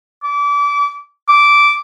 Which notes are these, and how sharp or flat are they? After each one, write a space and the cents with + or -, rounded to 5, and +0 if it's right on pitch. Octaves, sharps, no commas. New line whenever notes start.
D6 -30
D6 -10